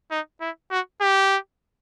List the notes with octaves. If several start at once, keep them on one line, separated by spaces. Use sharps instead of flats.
D#4
E4
F#4
G4